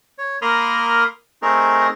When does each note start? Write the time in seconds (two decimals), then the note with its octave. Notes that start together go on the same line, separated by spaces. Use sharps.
0.18 C#5
0.42 A#3 A#4 B5 C6 D#6 F6
1.42 A3 C4 D#4 G#4 A#4